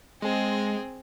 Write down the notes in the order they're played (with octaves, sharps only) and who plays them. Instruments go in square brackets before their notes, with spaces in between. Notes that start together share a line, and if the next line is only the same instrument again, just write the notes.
[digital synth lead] G#3 [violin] C4 G#4